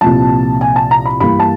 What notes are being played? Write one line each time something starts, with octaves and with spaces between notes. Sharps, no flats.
C2 A#2 F3 A5
G#5
A5
A#5
B5
G2 E3 G3 A#3 B5
A5